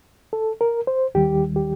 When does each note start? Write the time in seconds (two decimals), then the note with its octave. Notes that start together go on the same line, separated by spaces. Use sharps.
0.33 A4
0.61 A#4
0.87 C5
1.14 D#2 D#3 G3 G4
1.56 G4